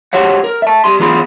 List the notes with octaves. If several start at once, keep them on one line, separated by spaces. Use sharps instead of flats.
F#4 G4 C5 C#5 F#5
A#4
E5 A5
G3 G4 C6
E3 B3 F4 G#4 B5 C6